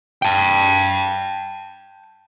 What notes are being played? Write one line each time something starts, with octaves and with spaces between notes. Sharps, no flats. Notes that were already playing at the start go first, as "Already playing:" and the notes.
G5 A5